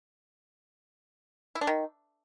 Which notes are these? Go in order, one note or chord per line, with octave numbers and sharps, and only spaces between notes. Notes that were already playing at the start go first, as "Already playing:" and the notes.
E4
D4
D#3